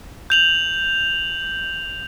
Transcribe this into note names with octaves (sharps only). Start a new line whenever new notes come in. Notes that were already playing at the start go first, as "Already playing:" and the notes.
G6 F7 F#7